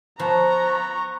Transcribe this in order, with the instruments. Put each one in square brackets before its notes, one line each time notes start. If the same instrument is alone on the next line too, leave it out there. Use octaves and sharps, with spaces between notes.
[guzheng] F3 [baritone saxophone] B3 [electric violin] A#5 [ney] C#6